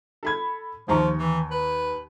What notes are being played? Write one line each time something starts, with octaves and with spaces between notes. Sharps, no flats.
A4 B5 G#6
D#2 F3 A#5 C#6
E3
B4